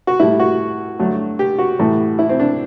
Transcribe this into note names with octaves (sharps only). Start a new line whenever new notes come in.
F#4
A2 G3 E4
F#4
G2 D3 F#3 A3
G4
F#4
A2 E3 G3
E4
C4
D4